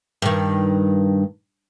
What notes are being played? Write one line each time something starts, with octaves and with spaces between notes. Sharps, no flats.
G2 D#3